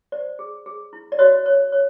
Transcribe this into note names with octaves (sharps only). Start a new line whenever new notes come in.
C5 D5
G#4
G#4
E4
D5
F#4 C#5 D#5
C#5
C#5